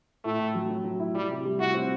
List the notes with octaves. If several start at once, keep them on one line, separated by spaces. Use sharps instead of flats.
A2 A3
A2
F#3
F#3
F#3
E4
G3 E4
C3
G3
E4 F#4
C4